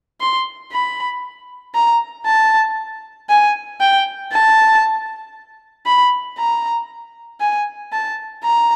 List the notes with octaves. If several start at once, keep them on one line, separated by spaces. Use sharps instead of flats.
C6
B5
A#5
A5
G#5
G5
A5
B5
A#5
G#5
A5
A#5